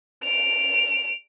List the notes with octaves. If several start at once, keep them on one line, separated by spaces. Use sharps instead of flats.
D7 F7